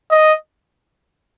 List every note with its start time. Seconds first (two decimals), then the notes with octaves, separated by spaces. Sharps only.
0.11 D#5